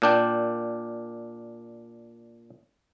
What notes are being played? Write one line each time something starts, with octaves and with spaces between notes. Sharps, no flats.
A#2 D4 G5